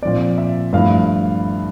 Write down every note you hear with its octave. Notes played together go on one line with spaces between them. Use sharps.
A#2 F3 C4 D5
E5
G2 F3 A3 E4 F5